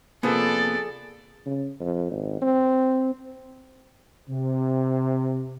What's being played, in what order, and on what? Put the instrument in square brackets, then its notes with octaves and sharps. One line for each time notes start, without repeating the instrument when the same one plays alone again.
[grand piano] C3 F3 B3 [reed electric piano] A#3 [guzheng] G#4 [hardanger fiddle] A4 D5
[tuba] C#3
F2
G#1
C4
[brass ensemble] C3